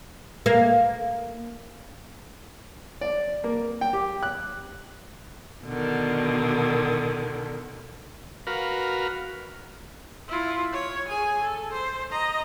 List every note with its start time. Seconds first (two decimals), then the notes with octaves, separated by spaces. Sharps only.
0.46 A#3
3.01 D5
3.44 A#3
3.81 G5
3.93 G4
4.23 F#6
5.65 B2 D3 D#3
8.47 F#4 A#4 B4 F5
10.28 E4 F4
10.72 C#5
11.07 G#4 G#5
11.42 A4
11.73 C5
12.11 D#5 A#5